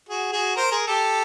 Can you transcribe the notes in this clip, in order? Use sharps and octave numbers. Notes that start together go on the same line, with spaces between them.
F#4 G#4
F#4 G#4
A#4 C5
G#4 A#4
G4 A4